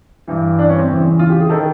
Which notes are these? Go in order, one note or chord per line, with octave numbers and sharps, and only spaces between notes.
G2 E3
D4
C#4
C4
E2 C#3 E3
F4
G4
G#4
D#3 A4